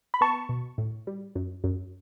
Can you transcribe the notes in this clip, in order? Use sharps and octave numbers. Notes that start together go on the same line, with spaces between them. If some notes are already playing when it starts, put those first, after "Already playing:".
B5
B3 A5 C#6
B2
A2
G3
F#2
F#2